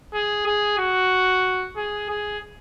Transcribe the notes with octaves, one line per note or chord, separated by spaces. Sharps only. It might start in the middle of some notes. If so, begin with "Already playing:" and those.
G#4
G#4
F#4
G#4
G#4